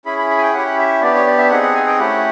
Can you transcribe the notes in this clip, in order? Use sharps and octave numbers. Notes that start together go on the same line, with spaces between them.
C#4 E4 G#4 B5
B5
B5
G#5
G5
C#4 E4 G4 F#5
E5
B3 D4 G4 D5
C#5
D5
E5
C4 D#4 G#4 F#5
F#5
G#5
G5
A3 C#4 E4 G4 F#5